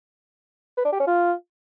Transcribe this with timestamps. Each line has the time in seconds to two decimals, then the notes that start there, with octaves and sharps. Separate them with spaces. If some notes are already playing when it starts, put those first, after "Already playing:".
0.77 B4
0.85 D4
0.92 G4
1.00 C#4
1.07 F4